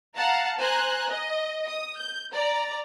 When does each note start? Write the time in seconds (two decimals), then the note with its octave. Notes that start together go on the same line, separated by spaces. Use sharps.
0.17 F5 F#5 A5 A#5
0.59 C5 G#5 A#5 F#6
1.11 D#5
1.67 D#6
1.98 G6
2.34 D5 A#5